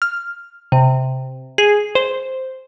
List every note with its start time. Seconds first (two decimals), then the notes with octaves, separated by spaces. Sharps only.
0.02 F6
0.72 C3
1.58 G#4
1.95 C5